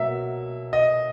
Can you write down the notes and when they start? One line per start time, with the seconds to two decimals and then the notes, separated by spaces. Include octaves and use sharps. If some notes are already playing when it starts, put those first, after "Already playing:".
Already playing: B2 F#3 A#3 E5
0.73 D#5